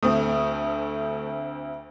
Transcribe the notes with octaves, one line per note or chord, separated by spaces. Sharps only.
D2 A3 C4 D#6